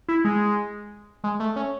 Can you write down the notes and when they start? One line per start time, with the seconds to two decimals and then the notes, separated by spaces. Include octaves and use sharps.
0.08 E4
0.25 G#3
1.24 G#3
1.40 A3
1.56 C#4